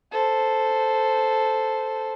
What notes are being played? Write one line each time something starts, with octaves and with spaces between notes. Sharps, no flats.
A4 C5